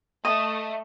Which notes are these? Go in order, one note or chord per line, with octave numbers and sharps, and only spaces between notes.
A3 D#5